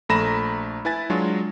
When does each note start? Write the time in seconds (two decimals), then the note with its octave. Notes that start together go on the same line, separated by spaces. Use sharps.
0.09 A#1 A3 A#5 B5 A#6 E7
0.85 E4 B4 G#5 A6
1.10 F#3 G#3 D4 F4 F#4